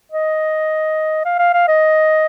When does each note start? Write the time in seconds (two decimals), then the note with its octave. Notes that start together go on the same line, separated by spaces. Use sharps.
0.12 D#5
1.25 F5
1.39 F5
1.53 F5
1.68 D#5